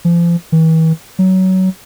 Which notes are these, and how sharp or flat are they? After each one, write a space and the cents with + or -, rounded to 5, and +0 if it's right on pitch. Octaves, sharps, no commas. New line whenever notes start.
F3 -35
E3 -40
F#3 +20